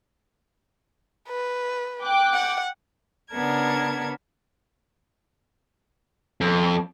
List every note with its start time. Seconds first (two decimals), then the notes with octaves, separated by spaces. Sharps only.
1.28 B4
2.02 G5 D6 F#6
2.33 F#5
3.32 C#3 B3 D4 A#4 A5 G#6
6.41 F2